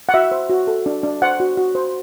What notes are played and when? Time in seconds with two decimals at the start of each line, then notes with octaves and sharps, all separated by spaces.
0.09 F#5
0.14 F#4 E5
0.31 C5
0.49 F#4
0.67 A4
0.86 D4
1.03 D4
1.22 C5 F#5
1.40 F#4
1.57 F#4
1.75 C5